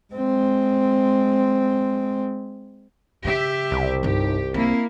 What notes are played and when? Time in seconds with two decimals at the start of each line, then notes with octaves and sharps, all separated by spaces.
0.14 G#3 C4
3.25 C#3 G4 E5
3.71 C2
4.03 G1 D#4 G4
4.54 A#3 C4 E4